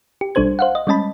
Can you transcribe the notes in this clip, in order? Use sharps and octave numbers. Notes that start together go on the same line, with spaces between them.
G4
B1 G3 D4 A4 C5 G#6
C5 F5 F#5
D#5
G3 G#3 C#4 D#5 A5 B5